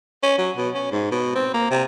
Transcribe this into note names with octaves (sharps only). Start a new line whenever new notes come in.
C#4
F#3
B2
C#4
G#2
B2
C4
A#3
C3